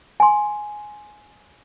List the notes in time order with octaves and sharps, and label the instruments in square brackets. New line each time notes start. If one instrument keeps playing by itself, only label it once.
[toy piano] G#5 C6